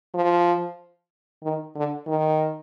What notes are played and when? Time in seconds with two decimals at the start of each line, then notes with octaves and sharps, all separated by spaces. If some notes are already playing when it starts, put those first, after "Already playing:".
0.14 F3
1.43 D#3
1.76 D3
2.07 D#3